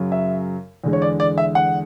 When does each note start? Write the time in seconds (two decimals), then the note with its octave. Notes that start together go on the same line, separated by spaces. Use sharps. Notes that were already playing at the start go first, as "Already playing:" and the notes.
Already playing: F#2 C#3 F#3
0.12 E5
0.84 E2 D3 G#3
0.93 C#5
1.02 D5
1.20 D5
1.38 E5
1.55 F#5